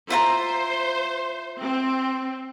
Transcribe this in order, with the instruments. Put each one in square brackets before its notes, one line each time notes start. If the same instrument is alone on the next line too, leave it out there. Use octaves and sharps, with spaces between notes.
[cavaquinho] E4 F4 A#5 [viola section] C5
[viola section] C4